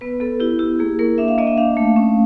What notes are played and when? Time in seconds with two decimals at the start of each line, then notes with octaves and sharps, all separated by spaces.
0.01 B3 B4
0.20 B3 A4
0.40 E4 G4
0.59 E4 G4
0.79 A#3 G#4
0.99 A#3 A#4
1.18 D4 E5
1.28 F5
1.38 A#3 D#5
1.47 E5
1.57 D4 F5
1.77 A3
1.96 C#4